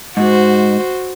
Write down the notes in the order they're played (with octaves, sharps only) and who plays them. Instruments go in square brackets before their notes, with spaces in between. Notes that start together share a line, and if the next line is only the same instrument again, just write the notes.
[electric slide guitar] G#2 [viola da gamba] F#4 C5